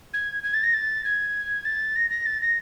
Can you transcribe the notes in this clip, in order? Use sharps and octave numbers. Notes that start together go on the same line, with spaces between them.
G#6
G#6
A6
A#6
A6
G#6
A6
A#6
A#6
A6
A#6